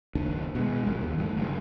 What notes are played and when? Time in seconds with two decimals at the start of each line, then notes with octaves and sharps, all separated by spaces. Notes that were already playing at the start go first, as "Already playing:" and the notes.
0.15 F#1 D#2 D4
0.55 B2 G#3
0.84 G1 C2 F#2 A#2
1.01 D#2
1.18 G2 G3 A3
1.37 F#1 G2